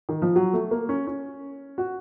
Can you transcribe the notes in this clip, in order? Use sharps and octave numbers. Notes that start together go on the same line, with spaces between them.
D#3
F3
F#3
A3
A#3
C#4
C#4
F#4